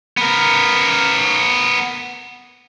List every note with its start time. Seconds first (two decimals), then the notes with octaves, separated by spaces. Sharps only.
0.17 B3 A#4